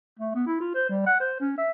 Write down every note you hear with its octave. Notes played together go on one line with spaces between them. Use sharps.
A3
B3
E4
F4
C5
G3
F#5
C5
C#4
E5